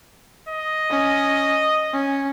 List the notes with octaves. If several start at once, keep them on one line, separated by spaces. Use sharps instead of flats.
D#5
C#4
C#4